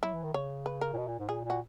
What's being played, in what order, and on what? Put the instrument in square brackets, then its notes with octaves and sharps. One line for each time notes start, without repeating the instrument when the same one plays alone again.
[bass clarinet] F#3 [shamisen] E4
[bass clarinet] E3
D#3
[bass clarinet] C#3 [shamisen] C#5
[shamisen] B4
A#4
[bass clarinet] A#2
B2
A#2
G#2
[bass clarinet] A#2 [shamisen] G#4
[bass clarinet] A#2 [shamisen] F#4